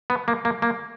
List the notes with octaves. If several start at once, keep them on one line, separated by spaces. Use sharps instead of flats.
B3
A#3
A#3
A#3